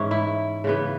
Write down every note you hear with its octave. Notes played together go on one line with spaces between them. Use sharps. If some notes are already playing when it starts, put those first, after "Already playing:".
Already playing: G#2 E3 C#4
E4
C#3 E3 B3